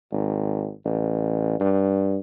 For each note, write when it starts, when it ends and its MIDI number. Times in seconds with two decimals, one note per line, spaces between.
0.12 0.70 32
0.85 1.60 33
1.60 2.18 43